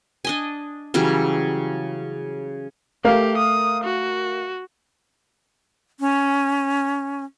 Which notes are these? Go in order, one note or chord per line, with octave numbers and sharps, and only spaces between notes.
D4 D#5 G#5
C#3 E3 F#3 G3
A3 G4 A#4 F5
D#6
F#4
C#4